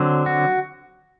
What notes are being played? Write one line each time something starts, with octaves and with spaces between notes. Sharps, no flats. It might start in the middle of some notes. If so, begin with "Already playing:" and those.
Already playing: D3 F#3 C4
F#4